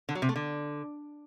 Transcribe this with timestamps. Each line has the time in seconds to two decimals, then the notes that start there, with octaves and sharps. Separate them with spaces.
0.09 D3
0.15 F#3
0.22 C3
0.29 A3
0.36 D3